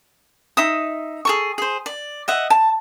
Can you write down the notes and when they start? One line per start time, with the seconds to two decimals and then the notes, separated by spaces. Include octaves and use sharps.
0.57 D#4 E5 D#6
1.25 G#4 A4 C#6
1.58 G#4 C5
1.86 D5
2.28 D#5 E5 F#5
2.50 A5